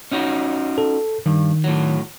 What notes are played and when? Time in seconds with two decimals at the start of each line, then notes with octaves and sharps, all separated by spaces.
0.11 C#4 D#4 F#4
0.78 A4
1.26 G2 D#3
1.64 A2 F#3